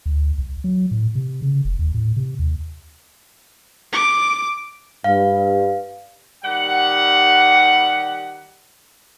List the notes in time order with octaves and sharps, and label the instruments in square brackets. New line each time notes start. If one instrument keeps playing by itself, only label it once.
[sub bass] D2
C2
F#3
A2
C3
C#3
F1
D#2
A2
C3
D#2
[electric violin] D6
[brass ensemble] G2 [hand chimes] F5
[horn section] D#3 G3 G4 F#5